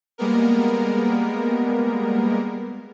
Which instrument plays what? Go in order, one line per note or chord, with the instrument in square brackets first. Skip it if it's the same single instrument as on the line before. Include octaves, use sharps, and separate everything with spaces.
[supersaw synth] G3 G#3 A#3 B3 A#4